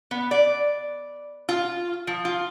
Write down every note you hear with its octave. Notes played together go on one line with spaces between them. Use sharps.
B3
D5
F4
F3
F4